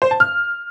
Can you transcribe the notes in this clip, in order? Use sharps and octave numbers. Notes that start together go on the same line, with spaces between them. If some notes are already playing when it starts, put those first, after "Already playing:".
C5
A5
F6